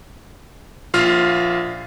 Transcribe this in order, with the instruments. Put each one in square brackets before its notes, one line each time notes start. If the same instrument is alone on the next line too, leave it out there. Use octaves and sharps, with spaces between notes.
[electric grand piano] A#1 F4 F5 F6